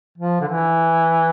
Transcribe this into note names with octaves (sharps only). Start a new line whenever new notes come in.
F3
D3
E3